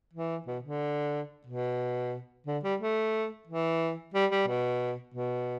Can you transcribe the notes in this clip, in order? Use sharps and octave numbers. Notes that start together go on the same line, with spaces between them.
E3
B2
D3
B2
D3
G3
A3
E3
G3
G3
B2
B2